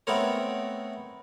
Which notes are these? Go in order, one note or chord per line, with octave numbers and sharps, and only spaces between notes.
A3 B3 C4 A#4 C#5